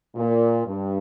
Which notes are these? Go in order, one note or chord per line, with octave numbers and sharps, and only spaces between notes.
A#2
G2